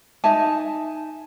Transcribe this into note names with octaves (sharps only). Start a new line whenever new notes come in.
D#4 E5 G#5 A5